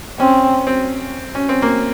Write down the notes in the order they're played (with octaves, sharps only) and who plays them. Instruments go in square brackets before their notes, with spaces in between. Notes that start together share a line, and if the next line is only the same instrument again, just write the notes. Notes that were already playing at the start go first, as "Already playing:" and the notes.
[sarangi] C4 [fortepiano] C#4
[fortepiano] C4
C#4
C4
A#3